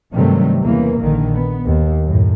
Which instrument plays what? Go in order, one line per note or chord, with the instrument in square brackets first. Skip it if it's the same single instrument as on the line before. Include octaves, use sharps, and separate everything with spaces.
[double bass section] G2 C3 D#3 F#3 G3 A3
E2 C#3 E3 A#3
A#1 D3 D#3
B3
D#2
F#2 A2